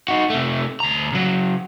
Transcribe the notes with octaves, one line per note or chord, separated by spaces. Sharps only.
D#4 F#4
C3 A3
D2 A#5
C#3 F#3